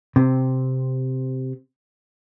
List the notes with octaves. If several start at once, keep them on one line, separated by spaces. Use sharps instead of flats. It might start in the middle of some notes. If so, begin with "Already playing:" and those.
C3 C4